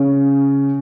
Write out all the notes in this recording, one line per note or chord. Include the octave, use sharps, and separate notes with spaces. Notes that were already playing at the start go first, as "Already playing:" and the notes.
Already playing: C#3